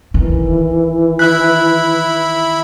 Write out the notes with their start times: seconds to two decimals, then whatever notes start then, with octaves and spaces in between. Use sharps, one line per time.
0.14 D#3 E3
1.19 E4 E5 B5 F#6